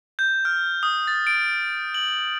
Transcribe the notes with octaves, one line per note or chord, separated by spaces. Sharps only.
G6
F6
D#6
A6
D7
F#7